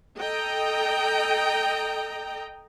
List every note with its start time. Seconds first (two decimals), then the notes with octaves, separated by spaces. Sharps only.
0.17 A4 D#5 G5 A#5